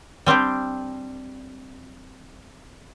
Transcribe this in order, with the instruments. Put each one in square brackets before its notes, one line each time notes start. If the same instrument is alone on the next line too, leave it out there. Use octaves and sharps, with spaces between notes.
[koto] G3 C4 D4 G4